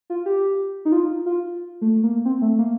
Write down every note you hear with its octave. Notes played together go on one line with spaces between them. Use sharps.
F4
G4
D#4
F4
F4
A3
A#3
C4
A3
A#3